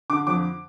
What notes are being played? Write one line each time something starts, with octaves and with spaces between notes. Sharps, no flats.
D3 D6
F2 D6